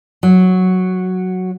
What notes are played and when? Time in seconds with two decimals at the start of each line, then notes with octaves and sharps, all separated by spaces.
0.23 F#3